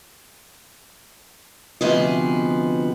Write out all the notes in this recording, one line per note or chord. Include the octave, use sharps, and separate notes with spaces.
D2 C3 F3 B3 G#4 D#5